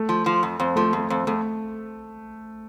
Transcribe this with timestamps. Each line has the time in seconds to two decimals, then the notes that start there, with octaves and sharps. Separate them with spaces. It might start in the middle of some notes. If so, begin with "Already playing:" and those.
Already playing: A3
0.09 F3
0.26 F3
0.43 F2
0.60 F2 C4
0.76 F3 A3
0.93 F2 A3
1.10 F2 C4
1.27 F2 A3